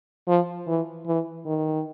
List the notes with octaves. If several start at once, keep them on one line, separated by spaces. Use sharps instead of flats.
F3
E3
E3
D#3